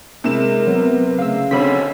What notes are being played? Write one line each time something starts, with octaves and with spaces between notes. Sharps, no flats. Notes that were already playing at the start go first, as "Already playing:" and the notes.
C3 G#3 E4 A#4 E7
F#3 B3
C#3 A3 F5 E6
B1 D3 C4 C#5 B5 B6